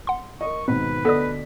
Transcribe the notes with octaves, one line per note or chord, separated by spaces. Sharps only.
F#5 C6
A#4 D#5 C#6
G#2 B2 D#3 C4 B4
D2 B3 A4 D5 D#5 D#6 B6